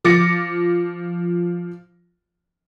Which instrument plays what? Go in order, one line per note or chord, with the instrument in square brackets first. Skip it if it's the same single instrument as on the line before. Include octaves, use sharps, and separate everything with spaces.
[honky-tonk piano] F3 D6 A6 A#6 C#7